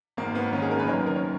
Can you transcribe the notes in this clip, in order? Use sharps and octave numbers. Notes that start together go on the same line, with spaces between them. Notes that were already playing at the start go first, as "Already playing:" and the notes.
G#1 G#2 D#3 A#3
B3
G#1 G#2 D#3 C#4
G#4
A#4
B4
F#1 F#2 D#3 C#5
A#4
C#5